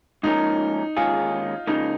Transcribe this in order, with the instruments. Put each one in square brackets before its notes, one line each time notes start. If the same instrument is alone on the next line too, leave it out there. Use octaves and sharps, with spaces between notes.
[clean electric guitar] G#2 F3 A#3 C#4 A#4 [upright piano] D#4
[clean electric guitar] D#2 D#3 G#3 C#4 G#4 [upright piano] F4
[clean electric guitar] C#2 C#3 F3 A#3 [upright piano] D#4